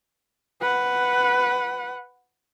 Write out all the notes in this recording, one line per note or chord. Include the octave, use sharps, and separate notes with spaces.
B4 F#5